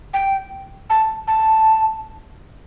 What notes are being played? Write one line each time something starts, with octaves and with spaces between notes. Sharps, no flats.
G5
A5
A5